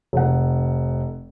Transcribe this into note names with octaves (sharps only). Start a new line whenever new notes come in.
F1 F#5